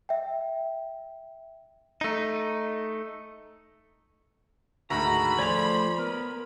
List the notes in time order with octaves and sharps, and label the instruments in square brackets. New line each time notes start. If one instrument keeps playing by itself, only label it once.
[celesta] E5 G5
[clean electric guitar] A3 D#4
[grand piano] D2 G#2 D#3 [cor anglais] F#4 [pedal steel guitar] A#5 [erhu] B5
[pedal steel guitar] F3 A3 G#5 [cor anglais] C5 [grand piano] D5 F7
[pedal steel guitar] B3 [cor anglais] A#4